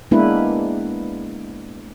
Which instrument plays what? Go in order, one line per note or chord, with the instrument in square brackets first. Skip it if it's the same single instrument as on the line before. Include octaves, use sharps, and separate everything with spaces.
[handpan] G#3 A#3 B3 D4 E4 B4